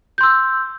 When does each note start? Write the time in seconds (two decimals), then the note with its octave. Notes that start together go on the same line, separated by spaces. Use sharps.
0.18 G6
0.21 C6
0.23 E6